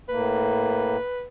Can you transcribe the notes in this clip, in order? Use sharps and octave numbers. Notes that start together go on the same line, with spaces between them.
A2 A#3 B4